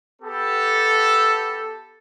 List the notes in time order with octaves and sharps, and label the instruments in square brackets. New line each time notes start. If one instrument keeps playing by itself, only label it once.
[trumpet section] B3 G4 A4